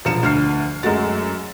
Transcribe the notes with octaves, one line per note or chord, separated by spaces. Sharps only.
E1 F3 C#7 E7
D2 F6 C7
F#2 G#3 A3 F#4 A6